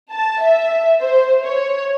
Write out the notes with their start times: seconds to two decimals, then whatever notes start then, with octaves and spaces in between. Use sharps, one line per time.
0.11 A5
0.40 E5
1.00 C5
1.44 C#5